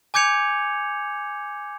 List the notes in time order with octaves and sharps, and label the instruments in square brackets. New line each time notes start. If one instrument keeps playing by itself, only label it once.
[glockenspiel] G#5 D6 G6 G#6 C#7 F7